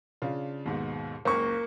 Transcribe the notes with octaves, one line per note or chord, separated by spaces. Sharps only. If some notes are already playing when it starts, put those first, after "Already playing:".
C#3 D4 F4
D#2 G#2 B2
F#1 C#2 A#3 C#6